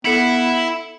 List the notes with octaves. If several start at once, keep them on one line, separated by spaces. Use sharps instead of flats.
B3 E4 A4 C#7 F#7